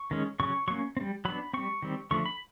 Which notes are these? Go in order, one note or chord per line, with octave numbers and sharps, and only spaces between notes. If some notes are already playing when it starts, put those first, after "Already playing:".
Already playing: C#6
D#3 G#3 C#4
C#3 F#3 C#4 C#6
F#3 A#3 C#4 C#6
C4
G3
F#3 B3 D4 B5
G3 C4 C#6
D#3 G3 C4
D3 F3 A3 D4 C#6
B5